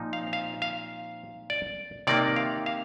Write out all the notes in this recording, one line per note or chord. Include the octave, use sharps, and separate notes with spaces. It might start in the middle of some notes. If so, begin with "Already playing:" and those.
Already playing: A#2 F3 C4 D#4
F5
F5
F5
D5
C3 D#3 A#3 D#4 D5
F5
F5